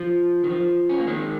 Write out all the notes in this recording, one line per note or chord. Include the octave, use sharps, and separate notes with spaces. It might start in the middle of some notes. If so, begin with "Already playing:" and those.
Already playing: F3
D#3
F3
C#4
A#3
D#3 G#3